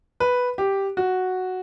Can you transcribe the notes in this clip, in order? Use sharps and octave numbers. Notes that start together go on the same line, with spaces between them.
B4
G4
F#4